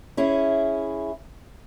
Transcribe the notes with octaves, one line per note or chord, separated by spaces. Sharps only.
C#4 E4 G#4